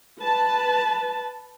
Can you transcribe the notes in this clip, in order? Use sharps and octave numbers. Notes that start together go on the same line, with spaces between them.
B4 A5